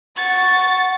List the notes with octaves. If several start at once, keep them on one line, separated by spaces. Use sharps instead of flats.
F#5 C#6 A6